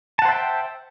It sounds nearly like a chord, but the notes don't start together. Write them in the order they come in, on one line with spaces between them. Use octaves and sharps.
A5 F#5 C5 E5 G5